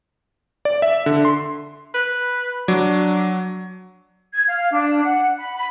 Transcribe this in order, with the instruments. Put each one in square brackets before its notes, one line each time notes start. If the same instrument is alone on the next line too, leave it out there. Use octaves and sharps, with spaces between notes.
[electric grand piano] D5
E5
D3
C6
[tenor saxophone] B4
[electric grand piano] F#3 [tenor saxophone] D4
[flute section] G#6
F5
D4
F#5
B5
B5